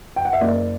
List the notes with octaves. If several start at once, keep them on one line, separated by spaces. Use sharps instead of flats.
G5
F#5
E5
F#1 D5